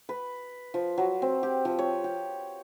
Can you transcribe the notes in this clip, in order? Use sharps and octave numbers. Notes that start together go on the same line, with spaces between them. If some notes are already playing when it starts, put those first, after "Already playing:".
B4
F3
F#3
C4
G4
F3
C#5
G4